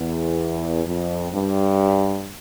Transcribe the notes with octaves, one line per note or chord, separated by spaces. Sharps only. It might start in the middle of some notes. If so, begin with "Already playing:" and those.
Already playing: E2
F2
G2